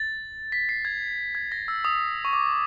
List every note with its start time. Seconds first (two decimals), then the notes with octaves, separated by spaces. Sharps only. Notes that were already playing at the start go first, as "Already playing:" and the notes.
Already playing: A6
0.52 B6
0.69 C7
0.85 G#6
1.35 G#6
1.52 A#6
1.68 E6
1.85 D#6
2.25 C#6
2.33 D6